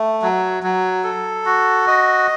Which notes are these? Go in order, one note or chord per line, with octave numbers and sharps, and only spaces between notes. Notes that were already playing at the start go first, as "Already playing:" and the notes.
Already playing: A3
F#3
F#3
A4
F#4
D#5